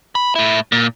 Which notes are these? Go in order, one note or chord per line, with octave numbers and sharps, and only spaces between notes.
B5
A2 E4
A#2